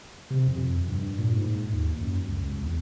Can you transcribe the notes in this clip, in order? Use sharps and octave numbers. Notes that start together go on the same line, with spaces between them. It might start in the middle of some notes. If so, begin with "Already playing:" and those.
C3
F2
G2
A#2
G#2
D#2
F#2
C#2
E2